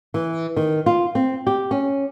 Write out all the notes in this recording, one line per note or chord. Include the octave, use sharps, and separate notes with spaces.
E3
D#3
F4
C4
G4
C#4